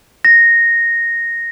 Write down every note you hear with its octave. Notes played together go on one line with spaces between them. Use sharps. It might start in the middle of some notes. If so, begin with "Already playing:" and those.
A#6